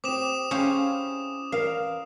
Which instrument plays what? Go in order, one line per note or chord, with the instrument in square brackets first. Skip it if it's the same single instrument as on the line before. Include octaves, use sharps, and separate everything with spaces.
[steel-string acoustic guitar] C4 G4 [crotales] D6 D#6 E7
[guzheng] C#4 C5 F5 [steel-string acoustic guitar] E4 G4 G#4
[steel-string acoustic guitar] E2 A#4 A#5 [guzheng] F5